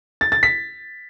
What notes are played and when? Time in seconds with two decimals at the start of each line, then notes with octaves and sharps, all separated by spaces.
0.21 A6
0.32 A6
0.43 B6